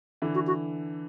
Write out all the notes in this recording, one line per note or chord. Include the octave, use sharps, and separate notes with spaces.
D3 E3
F#4
F#4